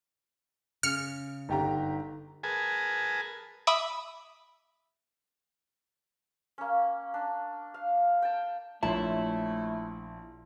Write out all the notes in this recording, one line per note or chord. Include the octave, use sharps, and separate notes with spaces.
C#3 F6 C#7
G1 D#4 G4 A#5
G#4 A#4 B4 G#5 A5
E5 B5 D6 D#6 E7
A#3 C#4
D4
F5
G5 A5
A#1 A3 E4 C#5 A5 C6